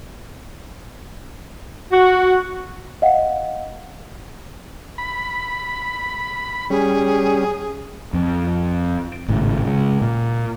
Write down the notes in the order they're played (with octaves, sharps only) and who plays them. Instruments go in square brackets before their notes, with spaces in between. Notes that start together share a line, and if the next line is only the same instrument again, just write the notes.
[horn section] F#4
[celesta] D#5 F5 F#5
[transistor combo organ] B5
[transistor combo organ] G3 C#4 [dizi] G#4
[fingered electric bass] F2 C4
G#1 A2 C#3
C#3 G#3
A#2